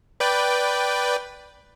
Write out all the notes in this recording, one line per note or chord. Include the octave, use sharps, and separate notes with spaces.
B4 D5 G5